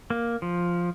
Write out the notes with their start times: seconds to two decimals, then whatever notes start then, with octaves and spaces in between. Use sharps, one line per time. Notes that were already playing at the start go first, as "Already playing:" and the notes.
0.10 A#3
0.42 F3